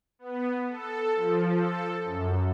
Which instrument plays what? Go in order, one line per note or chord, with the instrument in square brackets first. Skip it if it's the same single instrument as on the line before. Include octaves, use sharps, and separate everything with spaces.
[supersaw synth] B3
A4
F3
A4
F#2